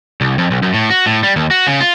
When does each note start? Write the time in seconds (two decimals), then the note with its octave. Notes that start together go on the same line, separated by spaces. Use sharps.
0.21 C2
0.38 F2
0.51 B1
0.62 F#2
0.74 A2
0.90 F#4
1.06 A2
1.23 G3
1.36 D#2
1.51 F#4
1.67 C#3
1.81 F4